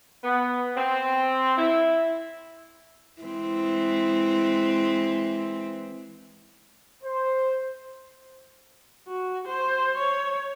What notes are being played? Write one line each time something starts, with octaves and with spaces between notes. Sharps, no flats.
B3
C4
E4
E3 G#3 C4
C5
F#4
C5
C#5